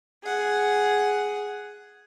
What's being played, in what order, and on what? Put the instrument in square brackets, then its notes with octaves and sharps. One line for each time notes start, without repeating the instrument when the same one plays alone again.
[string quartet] G#4 F#5